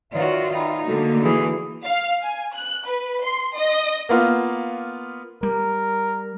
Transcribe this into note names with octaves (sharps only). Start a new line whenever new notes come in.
D#3 F4 F#4 B4 C#5 D5 E5
D#4 G5 B5
D3 A3 A#3 F#4 A4
E3 G#4
F5
G#5
F#6
B4
C6
D#5
A#3 B3 F4
G3 A#4